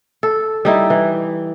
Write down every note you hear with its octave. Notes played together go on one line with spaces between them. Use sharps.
A4
G3 D#4 E4
E3